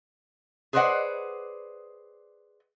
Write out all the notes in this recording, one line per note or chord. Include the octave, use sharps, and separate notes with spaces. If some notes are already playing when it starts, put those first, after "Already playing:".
G#4 B4 C5 D5 D#5 F#5